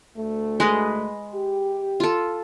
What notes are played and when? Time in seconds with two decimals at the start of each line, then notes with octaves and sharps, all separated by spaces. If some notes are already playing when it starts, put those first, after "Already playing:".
0.16 D2 A3
0.60 G#3 B4 D#5
1.34 G4
2.00 F4 A4